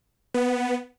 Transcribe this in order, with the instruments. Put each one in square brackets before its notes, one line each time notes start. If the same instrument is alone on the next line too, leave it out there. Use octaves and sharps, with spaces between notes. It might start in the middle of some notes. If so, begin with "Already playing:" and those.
[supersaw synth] B3